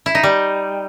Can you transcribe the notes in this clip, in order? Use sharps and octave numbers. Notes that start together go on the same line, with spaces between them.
E4
D#4
G3